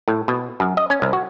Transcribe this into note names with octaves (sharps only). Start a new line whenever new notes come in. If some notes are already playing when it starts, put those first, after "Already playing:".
A2
B2
F#2
D#5
C#4
C2
F#4